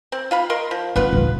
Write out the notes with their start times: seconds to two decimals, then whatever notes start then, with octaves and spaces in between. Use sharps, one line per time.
0.12 C4
0.31 F4 F5 B5
0.50 A#4 D#5 C6
0.71 F3
0.96 B3 C#4 D#4 F4 B4
1.13 D#2 A#2